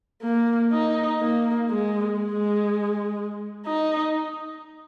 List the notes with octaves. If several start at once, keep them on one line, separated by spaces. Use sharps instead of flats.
A#3
D#4
A#3
G#3
G#3
D#4